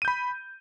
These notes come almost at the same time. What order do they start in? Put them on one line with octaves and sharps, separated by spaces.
D#7 G6 B5